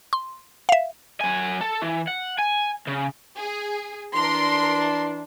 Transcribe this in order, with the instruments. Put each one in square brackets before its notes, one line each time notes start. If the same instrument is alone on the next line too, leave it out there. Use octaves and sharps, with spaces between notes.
[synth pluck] C6
E5 F5
[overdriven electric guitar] F#3 G#5
A4
E3
F#5
G#5
C#3
[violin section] G#4
[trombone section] E3 D4 [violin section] A#4 C6